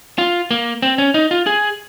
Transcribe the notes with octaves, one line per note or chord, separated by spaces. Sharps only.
F4
A#3
C4
C#4
D#4
F4
G#4